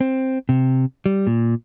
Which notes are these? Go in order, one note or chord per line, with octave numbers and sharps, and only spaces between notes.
C4
C3
G3
A#2